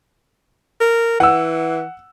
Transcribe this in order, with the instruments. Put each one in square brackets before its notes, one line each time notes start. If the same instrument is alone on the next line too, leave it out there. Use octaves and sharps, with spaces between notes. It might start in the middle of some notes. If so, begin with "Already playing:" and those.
[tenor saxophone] A#4
[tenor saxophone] E3 [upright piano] F#5 E6